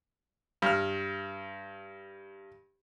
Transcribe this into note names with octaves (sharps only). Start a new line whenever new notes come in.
G2 F6